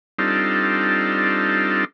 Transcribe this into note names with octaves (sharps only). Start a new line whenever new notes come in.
G3 C4 D4 D#4 F4 A4